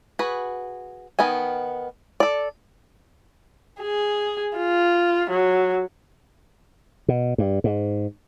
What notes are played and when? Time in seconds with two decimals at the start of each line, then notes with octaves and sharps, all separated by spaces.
0.19 F#4 G#4 B4
1.19 D#3 B3 D#5 G#5
2.20 A4 D5
3.81 G#4
4.57 F4
5.30 F#3
7.08 B2
7.38 G2
7.64 G#2